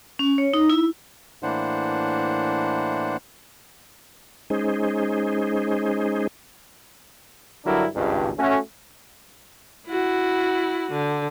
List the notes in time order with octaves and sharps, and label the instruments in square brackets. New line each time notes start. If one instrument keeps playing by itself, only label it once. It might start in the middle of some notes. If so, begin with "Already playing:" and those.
[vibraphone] C#4
C#5
D#4
E4
[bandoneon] A2 E3 A#3 D4 C5 F#5
[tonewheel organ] G#3 C#4 D#4 G#4 C5
[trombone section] G2 D3 F#3 D4 E4 A#4
G#1 C#2 G2
A3 C#4 F#4
[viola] E4 F#4
D3